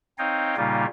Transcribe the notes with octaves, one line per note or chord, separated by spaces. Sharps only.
C4 D#4 C#5 D#5 F5 G5
A#2 C#3 G3 A#3 D#4 F4